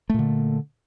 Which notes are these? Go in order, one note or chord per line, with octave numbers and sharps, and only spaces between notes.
A#2 D3 A3